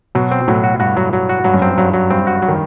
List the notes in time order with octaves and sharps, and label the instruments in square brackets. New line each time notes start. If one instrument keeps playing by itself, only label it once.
[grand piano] B2 [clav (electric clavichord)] F#3
[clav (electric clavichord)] C4
[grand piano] A2 [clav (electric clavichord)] F#3
[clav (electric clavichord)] F#4
[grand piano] G2 [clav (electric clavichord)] F#4
[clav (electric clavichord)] F#3
F#3
F#4
[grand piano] G2 [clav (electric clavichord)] F#3
[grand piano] F#2
[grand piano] G2 [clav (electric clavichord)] C4
[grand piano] G2 [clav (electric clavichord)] F#3
[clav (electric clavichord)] F#3
[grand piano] G2 [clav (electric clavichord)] C4
[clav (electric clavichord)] F#4
F#3
[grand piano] D#3